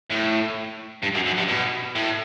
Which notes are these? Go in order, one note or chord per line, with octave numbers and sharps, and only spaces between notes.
A2
G2
F#2
F#2
G2
B2
A2